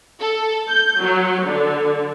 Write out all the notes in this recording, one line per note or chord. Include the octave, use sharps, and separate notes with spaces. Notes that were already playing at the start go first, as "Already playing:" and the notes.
A4
G6
F#3
D3